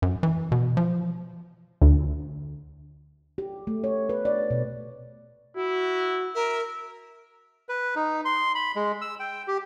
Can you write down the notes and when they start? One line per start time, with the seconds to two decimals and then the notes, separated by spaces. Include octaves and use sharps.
0.02 F#2
0.23 E3
0.52 B2
0.77 F3
1.82 D2
3.38 G4
3.67 A3
3.84 C#5
4.09 B4
4.25 D5
4.51 B2
5.57 E4 F#4
6.35 A#4 E5
7.69 B4
7.96 D#4
8.25 C6
8.55 B5
8.76 G#3
9.01 E6
9.20 G5
9.48 G4